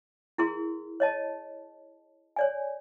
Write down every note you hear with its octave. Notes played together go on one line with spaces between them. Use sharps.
E4 G#4 A#4 C6
C#5 D#5 A5
C#5 D5 G#5